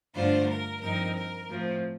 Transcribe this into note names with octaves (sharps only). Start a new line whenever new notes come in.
G2 D3 A3 D4 F4 C5
A#4
G2 F3 C4 D#4 A#4
A#4
A2 F3 C4